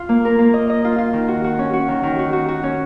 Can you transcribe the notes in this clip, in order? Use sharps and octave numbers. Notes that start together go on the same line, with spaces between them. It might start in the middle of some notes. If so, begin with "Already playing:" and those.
Already playing: F4
A#3
A#4
A#3
D#5
D#5
F4
F4
D#3
F#4
F#4
C#4
F#4
D#3
D#3
F#4
F#4
F#4
C#4